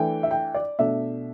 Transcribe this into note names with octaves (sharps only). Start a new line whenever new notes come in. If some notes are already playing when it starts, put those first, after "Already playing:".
Already playing: E3 A3 D4 G5
E5
G5
D5
B2 A3 D4 E5